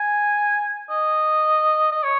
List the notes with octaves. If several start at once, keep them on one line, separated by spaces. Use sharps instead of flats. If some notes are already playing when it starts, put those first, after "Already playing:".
Already playing: G#5
D#5
D#5
C#5